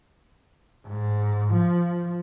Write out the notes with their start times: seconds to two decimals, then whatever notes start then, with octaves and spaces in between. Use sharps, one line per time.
0.87 G#2
1.54 F3